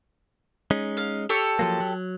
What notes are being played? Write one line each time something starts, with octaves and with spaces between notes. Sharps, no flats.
G#3 C#4 D#4
F5
G4 A4 C#5
F3 F#3 A#3
F#3